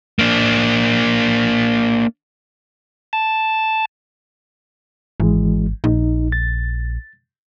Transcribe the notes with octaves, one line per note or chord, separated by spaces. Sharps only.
A#3 D4
A5
G#1 E3 G#3
A#1 D#4
A6